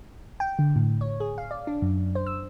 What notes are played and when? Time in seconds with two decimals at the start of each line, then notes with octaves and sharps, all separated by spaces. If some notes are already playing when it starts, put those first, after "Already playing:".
0.40 G5
0.59 D3
0.76 A2
1.01 C#5
1.20 G#4
1.38 F5
1.51 D5
1.67 D4
1.82 F#2
2.15 C5
2.27 E6